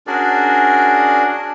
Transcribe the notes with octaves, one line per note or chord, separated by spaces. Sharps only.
C#4 D4 F#4 G#4 A#4 D5